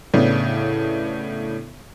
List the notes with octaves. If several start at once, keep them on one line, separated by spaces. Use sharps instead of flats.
A2 C#3 B3 D4